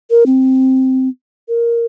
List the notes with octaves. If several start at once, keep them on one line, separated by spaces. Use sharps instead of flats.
A#4
C4
A#4